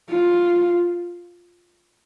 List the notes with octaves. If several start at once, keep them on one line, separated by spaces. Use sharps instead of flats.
F4